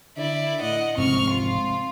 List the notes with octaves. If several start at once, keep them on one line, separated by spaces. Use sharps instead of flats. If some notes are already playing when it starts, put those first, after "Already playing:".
D3 E4 D5
A2 D#5 F#5
F1 G#2 G#3 C4 C#6 F6
F4